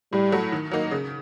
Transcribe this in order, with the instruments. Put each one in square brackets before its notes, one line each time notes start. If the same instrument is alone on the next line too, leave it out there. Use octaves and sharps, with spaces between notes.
[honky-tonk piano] A2 [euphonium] G3
[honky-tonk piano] F#3 A3
D#3
F#3 A#3 D#4
C#3